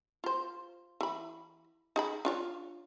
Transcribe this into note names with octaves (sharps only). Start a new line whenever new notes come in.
F4 C5
E3 B5
D#4 G#4 B5
D4 F4 C#5